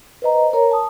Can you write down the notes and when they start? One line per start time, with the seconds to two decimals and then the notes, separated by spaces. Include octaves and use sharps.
0.22 B4 C5 D#5 A#5
0.53 A#4 C#5 A#5
0.71 A5 D#6